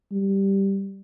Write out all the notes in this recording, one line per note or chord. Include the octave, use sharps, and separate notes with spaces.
G3